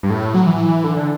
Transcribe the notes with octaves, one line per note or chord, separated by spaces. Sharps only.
G2
A2
F#3
E3
D3
D3